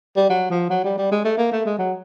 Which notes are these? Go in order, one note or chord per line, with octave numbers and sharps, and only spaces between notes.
G3
F#3
F3
F#3
G3
G3
G#3
A3
A#3
A3
G#3
F#3